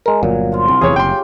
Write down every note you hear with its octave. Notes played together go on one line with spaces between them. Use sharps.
G#3 A#4
G1 A#2 F#3
F3 F4
C2
F1 E2 C#3 E3 G4 G#4 C#5
F#1 G5 C6